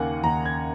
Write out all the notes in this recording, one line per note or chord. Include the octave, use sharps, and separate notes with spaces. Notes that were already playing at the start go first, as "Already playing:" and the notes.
Already playing: D#2 C#3 A#3 F#5 G#5
D#2 A#5
G#6